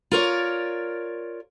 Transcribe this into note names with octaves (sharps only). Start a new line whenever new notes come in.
F4 A#4 C#5 D5